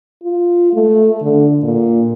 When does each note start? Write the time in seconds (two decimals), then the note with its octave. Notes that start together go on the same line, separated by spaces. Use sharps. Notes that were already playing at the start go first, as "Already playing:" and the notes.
0.23 F4
0.73 A3
1.22 D3
1.63 A#2